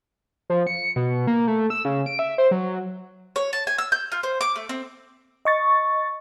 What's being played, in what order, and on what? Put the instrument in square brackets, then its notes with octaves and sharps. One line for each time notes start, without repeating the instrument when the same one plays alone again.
[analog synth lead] F3
C#7
B2
A#3
A3
E6
C#3
D7
E5
C5
F#3
[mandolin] C#5
A5
G#5
E6
G6
F4
C5
D6
A3
C4
[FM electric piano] D#5 C#6 A6